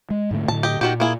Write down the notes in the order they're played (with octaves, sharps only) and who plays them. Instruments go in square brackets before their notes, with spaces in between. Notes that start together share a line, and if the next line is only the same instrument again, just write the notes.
[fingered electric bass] G#3
G#2 D3 A3
[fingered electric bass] A2 D3 [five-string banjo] A5
[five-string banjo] G4 D#5
[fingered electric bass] A#2 [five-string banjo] D#3 F#4 G4
[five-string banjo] A#3 E4 G#4